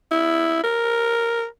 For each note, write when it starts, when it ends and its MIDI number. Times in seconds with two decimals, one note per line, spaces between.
0.11 0.63 64
0.64 1.45 70